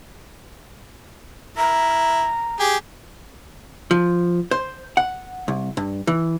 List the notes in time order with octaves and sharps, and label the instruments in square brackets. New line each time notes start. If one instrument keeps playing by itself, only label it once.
[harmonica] E4 [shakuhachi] A#5
[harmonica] G4 G#4
[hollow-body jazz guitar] F3
C5
F#5
C2
G2
E3